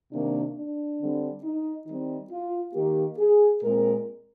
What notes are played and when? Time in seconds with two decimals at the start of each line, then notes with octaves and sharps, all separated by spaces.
0.11 C3 D#3 A#3 D4
0.55 D4
0.99 D3 G3 C4
1.42 D#4
1.87 D#3 G3 C4 D#4
2.31 F4
2.74 D#3 A#3 G4
3.18 G#4
3.62 A#2 G#3 C4 A#4